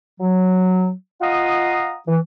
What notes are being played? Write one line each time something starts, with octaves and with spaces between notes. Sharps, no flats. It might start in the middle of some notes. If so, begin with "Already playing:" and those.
F#3
F4 D#5 F5 F#5 A#5 D#6
E3